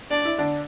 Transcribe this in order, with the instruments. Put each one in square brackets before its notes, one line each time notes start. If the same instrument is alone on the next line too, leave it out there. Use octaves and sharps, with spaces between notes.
[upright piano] D4 [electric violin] D5
[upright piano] E4
D3 D4